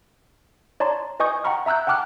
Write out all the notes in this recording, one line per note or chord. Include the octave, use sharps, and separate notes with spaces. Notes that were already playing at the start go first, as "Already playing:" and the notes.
C#5 D5 A5 A#5 C6
B4 D#5 G#5 C#6 D#6 G6
F#5 G5 A#5 B5 C#6 F6
E5 A#5 E6 F#6 G6
F#5 G5 A5 D6 F6 F#6